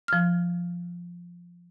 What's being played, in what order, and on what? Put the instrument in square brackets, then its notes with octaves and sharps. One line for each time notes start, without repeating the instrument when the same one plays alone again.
[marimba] F3 F6